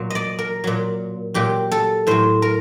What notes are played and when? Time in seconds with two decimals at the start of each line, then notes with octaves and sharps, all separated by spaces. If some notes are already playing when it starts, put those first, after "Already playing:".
Already playing: A#2 F#3
0.10 D5 D#5
0.39 A#4
0.64 A#2 F#3
1.34 A#2 F#3 G4
1.72 A4
2.07 A2 F#3 C5
2.42 A#4